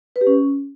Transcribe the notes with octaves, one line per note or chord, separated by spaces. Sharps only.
B4
G4
C#4